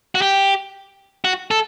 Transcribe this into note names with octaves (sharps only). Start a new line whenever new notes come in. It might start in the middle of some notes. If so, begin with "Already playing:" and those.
F#4
G4
F#4
A4